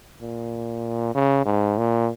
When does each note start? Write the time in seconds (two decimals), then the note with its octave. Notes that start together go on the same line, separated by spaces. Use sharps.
0.22 A#2
1.15 C#3
1.45 G#2
1.77 A#2